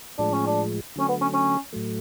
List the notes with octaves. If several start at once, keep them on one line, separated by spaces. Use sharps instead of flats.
A2 F3 G#3 D4
C#4
D4
D3 F#3 A3 C#4
B3
C#4
C#4
A2 F#3 A3